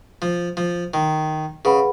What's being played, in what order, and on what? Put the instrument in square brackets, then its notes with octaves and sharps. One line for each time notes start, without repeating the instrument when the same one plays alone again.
[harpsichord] F3
F3
D#3
[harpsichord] C#3 [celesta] G#4 B4 F#5 B5